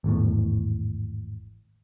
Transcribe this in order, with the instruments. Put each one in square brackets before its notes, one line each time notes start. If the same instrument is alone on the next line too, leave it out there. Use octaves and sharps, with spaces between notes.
[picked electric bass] G#1 E2 A2